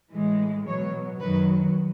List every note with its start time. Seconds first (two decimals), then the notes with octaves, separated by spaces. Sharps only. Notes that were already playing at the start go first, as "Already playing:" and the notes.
0.13 A2 E3 G#3
0.67 B2 F#3 C#5
1.20 F#2 D#3 F#3 B4